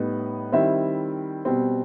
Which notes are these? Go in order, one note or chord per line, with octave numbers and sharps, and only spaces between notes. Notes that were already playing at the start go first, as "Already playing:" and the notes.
Already playing: A2 G3 B3 D#4
D#3 G3 C4 E4 E5
B2 G3 C4